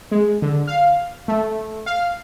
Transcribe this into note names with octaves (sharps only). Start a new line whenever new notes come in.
G#3
D3
F5
A3
F5